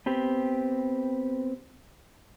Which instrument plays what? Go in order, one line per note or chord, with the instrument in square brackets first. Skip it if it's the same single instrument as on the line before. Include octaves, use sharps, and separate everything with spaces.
[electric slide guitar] B3 C4 G4